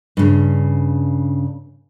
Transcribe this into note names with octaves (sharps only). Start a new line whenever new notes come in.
G2 C#3